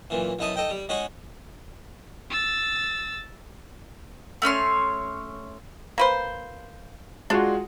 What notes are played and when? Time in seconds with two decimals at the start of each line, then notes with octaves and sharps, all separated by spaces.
0.10 F#2 A#2 E3
0.39 B1 F#2 D#4 E4 A5 D#6
0.56 D#4 A4 D#5 G5
0.70 G3
0.89 G#3 C#4 D#4 F#4 G#4 F#5
2.30 E6 A6
4.42 A3 C#4 C#5 C6
5.98 A#3 B4 C5
7.30 G#3 D4 F4 F#4